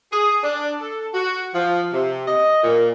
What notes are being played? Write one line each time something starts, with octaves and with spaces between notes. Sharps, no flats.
G#4
D4
A4
F#4
F3
C3
D#5
A#2